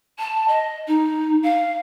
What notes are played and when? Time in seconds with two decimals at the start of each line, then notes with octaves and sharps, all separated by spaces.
0.19 A5
0.48 D#5
0.88 D#4
1.43 F5